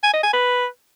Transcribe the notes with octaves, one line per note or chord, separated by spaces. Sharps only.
G#5
D#5
G#5
B4